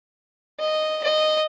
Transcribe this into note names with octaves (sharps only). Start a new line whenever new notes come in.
D#5
D#5